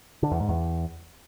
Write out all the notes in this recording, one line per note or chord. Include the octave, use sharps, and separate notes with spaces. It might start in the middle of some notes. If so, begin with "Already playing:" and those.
D3
E2
G#2
E2